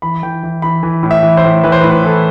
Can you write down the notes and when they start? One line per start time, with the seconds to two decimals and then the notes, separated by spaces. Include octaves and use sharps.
0.02 E3 B5
0.23 E3 G5
0.43 E3
0.62 E3 B5
0.83 E3
1.03 A2
1.11 E5
1.23 E3
1.37 C5
1.44 A2
1.64 E3 B4
1.72 C5
1.81 B4
1.84 A2
1.91 B4
2.04 E3 A4